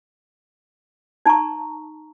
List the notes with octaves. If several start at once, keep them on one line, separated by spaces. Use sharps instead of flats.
D#4 A5 A#5 C#6